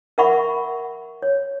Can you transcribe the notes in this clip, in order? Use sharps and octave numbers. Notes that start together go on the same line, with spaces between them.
A#4 E5 F#5 B5 C#6
C#5